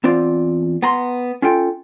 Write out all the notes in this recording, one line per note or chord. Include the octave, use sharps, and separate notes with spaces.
E2 C4 F4 D5
B3 A#5 C6
C#4 F4 A4 G5